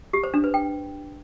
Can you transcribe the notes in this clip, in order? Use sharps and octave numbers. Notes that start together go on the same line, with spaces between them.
G4
C5
D4
B4
G5